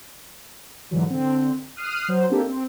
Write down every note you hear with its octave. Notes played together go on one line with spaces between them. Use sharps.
G#2 D3 E3 F#3
D3 C4
D#6 F6 F#6 C7 D#7
F#3 C5
A#3 C4 D4 D#4 G4 A4
C4